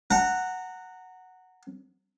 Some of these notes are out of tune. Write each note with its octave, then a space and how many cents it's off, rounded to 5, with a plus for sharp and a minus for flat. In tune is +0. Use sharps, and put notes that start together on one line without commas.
F#5 +0 A#5 -25